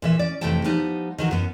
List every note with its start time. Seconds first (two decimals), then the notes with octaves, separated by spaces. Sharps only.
0.02 A#2 E3 E5
0.19 C#4 D5
0.41 F2 C3 E3 A3 G5 A5
0.64 F3 G3 B3 D#4
1.18 D#3 E3 F#3
1.31 F#2 B3